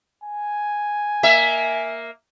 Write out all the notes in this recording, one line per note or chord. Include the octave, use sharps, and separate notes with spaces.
G#5
A#3 E5